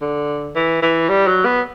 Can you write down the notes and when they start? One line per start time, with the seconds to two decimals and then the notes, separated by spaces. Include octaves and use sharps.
0.01 D3
0.55 E3
0.82 E3
1.09 G3
1.27 F#3
1.45 B3